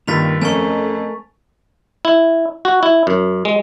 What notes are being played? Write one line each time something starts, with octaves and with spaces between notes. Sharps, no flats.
G2 D#3 A#3 F4 A6 B6 F7
F2 A3 C4 C#4 A#4 G#5 A5 C#6
E4
F#4
E4
F#2
G#3